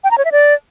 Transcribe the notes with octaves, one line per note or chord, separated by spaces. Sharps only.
G5
A#5
C#5
E5
D5